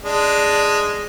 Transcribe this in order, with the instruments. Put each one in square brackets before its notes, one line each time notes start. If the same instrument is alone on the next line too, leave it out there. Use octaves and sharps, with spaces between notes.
[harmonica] G#3 D4